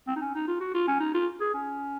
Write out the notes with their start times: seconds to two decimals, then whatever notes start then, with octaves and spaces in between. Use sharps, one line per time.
0.08 C4
0.16 D#4
0.21 C#4
0.35 D#4
0.47 F4
0.60 F#4
0.74 F4
0.88 C#4
1.00 D#4
1.14 F4
1.40 G#4
1.54 C#4